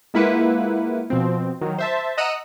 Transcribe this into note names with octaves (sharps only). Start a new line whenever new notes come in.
G#3 A#3 E4 F4 B4 F#5
B2 F3 C4
D#3 F#3
C5 E5 A5
D#5 F#5 A#5 E6 F#6 D#7